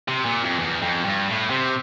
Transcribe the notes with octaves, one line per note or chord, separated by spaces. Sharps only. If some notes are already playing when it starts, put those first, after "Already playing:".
C3
A#2
F2
E2
F2
G2
A2
C3